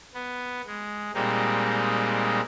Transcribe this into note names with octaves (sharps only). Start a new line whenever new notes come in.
B3
G#3
A#2 G3 G#3 C4 D#4